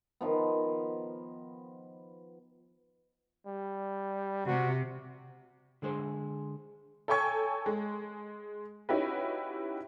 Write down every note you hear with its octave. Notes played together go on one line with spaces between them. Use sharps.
D#3 F3 B3
G3
C3 F#4
D3 G#3 G#4 C5
A4 C#5 G5 G#5 C#6 G#6
G#3
C#4 D#4 E4 F#4 G4 B4